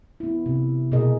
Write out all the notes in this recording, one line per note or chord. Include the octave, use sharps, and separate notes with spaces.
B3 E4
C3
B2 A#3 G#4 A#4 D#5